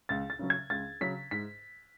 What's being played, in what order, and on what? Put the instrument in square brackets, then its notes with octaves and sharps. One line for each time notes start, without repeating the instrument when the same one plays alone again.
[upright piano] C#2 A6
A6
C#3 F#3 C#4
G#6
C#2 A6
C#3 F#3 C#4 B6
G#2 B6